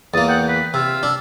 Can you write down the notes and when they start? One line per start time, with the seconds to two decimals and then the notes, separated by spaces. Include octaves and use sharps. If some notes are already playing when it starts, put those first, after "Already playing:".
0.14 E2 A#3 D#6 A6
0.28 F#5 G5
0.48 B4 B6
0.74 C3 F4 E6
1.03 D4